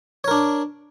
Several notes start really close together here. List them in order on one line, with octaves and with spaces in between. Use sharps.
C#5 A#4 D4